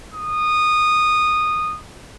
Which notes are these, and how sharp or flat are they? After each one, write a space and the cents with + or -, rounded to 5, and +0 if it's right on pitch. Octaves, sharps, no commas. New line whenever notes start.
D#6 -15